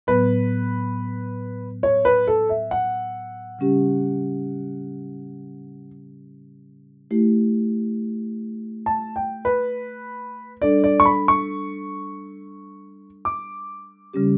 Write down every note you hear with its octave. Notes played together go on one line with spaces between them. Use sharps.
A2 F#3 B3 B4
C#5
B4
A4
E5
F#5
C#3 G3 C#4 G4
A3 E4 G4
A5
G5
B4
G3 D4 A4 D5
D5
C#6
B5
C#6
D6
C#3 G3 C#4 G4